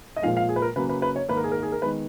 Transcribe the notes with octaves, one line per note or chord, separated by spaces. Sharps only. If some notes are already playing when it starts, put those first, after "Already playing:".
D#5
A#2 F3 G#3 F5
F5
G#4
B4
A#4
C#3 F#3 A#3 B4
B4
B4
C#5
G#2 D#3 A#3 B4
A#4
G#4
A#4
G#4
A#4
D#3 G#3 B3 B4